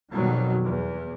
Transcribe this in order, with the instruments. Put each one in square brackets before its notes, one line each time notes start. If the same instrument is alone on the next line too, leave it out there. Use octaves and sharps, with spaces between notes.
[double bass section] F2 B2 D#3 F#3 G3
E2